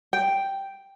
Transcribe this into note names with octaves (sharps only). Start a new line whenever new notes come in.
G5